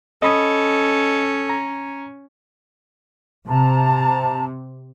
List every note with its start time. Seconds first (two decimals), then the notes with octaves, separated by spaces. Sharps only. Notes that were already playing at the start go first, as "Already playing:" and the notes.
0.22 C#4 A4 D#5 B5 D#6
1.49 A#5
3.48 C3 A5 A#5